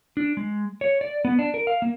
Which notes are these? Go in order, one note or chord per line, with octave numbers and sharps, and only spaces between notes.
D4
G#3
C#5
D5
B3
D4
A#4
F5
A#3